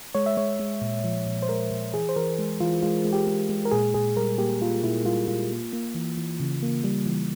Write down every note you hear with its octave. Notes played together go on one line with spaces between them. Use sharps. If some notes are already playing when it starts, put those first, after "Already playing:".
G#3 C#5
E5
G#3 C#5
G#3
A#2
F3
A#2
C5
G#3 A#4
A#2
E3 G#4
C5
E3 A#4
G#3
E3 F4
G#3 F4
G#3
G4
G#3
G#3
A#4
A#2 G#4
A#2 G#4
G3 A#4
A#3 G4
A#3 F4
A#2 E4
G3 F4
A#2 F4
A#3
A#3
E3
E3
C#3
A#3
G3
E3